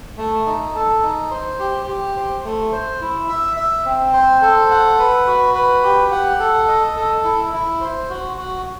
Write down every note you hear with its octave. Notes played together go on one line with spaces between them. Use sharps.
A3
D#4
A4
D#4
C5
G4
G4
C5
A3
C5
E4
E5
E5
C4
C5
A4
F#5
B4
F#4
B4
G4
F#5
A4
D#5
A4
E4
E4
C5
F#4
F#4